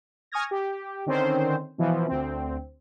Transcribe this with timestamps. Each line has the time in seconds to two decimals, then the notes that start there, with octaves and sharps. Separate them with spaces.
0.32 G#5 C#6 D#6 F6 G#6 A#6
0.51 G4
1.06 D3 D#3 C4 C#4 C5
1.78 B2 E3 F3
2.08 D2 C4